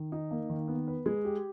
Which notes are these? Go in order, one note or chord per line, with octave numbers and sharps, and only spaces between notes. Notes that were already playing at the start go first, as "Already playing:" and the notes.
Already playing: D#3
D#4
A#3
D#3
B3
B4
G#3
G4